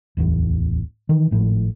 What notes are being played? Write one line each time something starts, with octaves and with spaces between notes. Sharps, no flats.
D1 A1 E2
D#3 E3
G#1 A2 F3